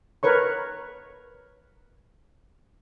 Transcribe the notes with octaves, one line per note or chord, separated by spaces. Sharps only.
A#4 B4 C#5 C#6